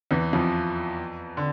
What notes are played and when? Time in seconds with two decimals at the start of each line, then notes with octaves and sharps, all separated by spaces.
0.11 E2 E3
0.33 F2 F3
1.37 D3